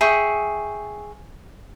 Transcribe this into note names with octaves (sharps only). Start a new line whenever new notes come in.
G#4 E5 G5 C#6